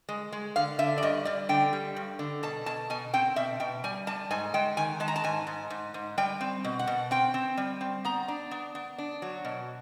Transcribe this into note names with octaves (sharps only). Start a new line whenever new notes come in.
G#3
G#3
D3 F5
D3 E5
D5
G2 D#5
G3 D5
D3 G5
G3
G2
D3
B2 A5
B2 A5
B2 G#5
C4 G5
B2 E5
B2 G5
G3 G#5
G3 A5
G#2 G#5
G#3 G5
D#3 G#5
G#3 A5
A#5
A5
G#2 G#5
G#2
G#2
G#2
G3 G5
C4
B2
F#5
B2
C4 G5
C4
G3
C4
B3 A#5
D4
B3
B3
D4
F#3
B2